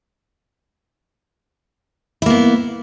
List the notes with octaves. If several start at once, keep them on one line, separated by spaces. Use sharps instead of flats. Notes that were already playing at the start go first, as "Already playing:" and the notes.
A#3 B3 E4